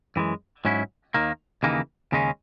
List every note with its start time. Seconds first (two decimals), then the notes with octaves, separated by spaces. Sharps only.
0.16 F#2 E3 G#3
0.65 G#2 F#3 C#4 E4
1.14 D#2 D#3 A#3
1.63 D#2 C#3 E3 A#3 D#4
2.12 D#2 C#3 G#3 C#4